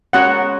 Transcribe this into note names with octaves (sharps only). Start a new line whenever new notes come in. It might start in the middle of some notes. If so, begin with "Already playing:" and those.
G#3 C#4 F#4 A#4 C#5 F#5